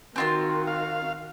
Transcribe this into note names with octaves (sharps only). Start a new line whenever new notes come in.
D#3 C4 F4 F#4 C6
F5